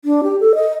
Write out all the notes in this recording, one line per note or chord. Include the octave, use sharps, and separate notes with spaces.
D4
G4
A4
D#5